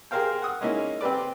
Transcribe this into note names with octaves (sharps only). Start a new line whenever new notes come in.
G4 G#4 A#4 C5 F5 G5
F#5 D#6
G#3 A#3 C#4 D#4 E4
C4 G4 B4 D5